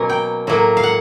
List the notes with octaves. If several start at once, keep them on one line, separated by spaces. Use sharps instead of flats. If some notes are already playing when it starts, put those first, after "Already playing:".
Already playing: B2 F#3 A#3 C#4
G5
A2 F#3 A#3
F5
F#5